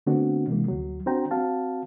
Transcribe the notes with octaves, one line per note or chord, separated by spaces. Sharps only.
D3 A3 B3 C4 D4 F#4
C3 E3 G#3 A#3
D2 F#3
C4 D4 F#4 C5 G5 A#5
C4 F#4 F5 A5